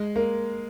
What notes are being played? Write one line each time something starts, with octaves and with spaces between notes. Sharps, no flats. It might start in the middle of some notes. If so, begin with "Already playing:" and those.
Already playing: G#3
A#3